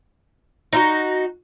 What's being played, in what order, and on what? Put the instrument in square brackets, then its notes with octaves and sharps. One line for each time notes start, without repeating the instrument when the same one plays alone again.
[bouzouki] D#4 E4 F#4